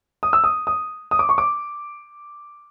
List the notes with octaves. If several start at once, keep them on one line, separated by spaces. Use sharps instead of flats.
D#6
E6
D#6
D#6
D#6
D6
C#6
D6